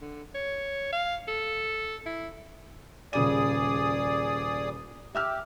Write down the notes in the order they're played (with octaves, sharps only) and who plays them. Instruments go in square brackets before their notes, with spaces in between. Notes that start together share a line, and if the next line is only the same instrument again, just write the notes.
[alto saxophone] D3
C#5
F5
A4
E4
[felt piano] D#1 C#3 D#7 [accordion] G#4 D5 D#6
[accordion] G4 [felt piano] E5 E6 F6